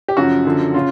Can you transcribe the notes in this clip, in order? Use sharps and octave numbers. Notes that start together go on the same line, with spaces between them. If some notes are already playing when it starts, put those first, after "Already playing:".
G4
F#2 C#3 F3 F#4
F#2 D3 F3
C#3 F4